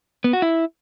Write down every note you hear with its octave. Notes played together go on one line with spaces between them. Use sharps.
B3
F#4
E4